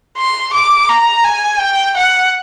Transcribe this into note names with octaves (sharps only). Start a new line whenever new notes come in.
C6
D6
A#5
G#5
G5
F#5